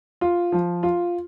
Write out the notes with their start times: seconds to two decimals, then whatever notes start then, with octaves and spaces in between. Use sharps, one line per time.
0.21 F4
0.52 F3
0.83 F4